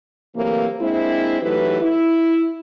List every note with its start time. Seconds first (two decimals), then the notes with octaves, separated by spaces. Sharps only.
0.35 C3 E3 F#3 A3 A#3
0.80 G#3 A#3 C4 D4 E4
1.42 E3 F#3 A3 D#4 G4 B4
1.81 E4